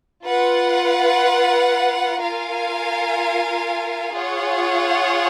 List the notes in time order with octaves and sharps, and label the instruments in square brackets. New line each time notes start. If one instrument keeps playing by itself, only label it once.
[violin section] F4 B4 F#5
F4 A#4 F5 G#5
F4 G#4 C#5 F#5